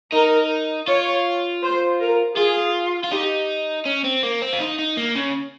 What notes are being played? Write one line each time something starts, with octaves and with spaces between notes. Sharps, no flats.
D#4 A#4
F4 C#5
C5
A#4
F4 G#4
F4
D#4 G4
C#4
C4
A#3
C4
F4
D#4
D#4
A#3
C#3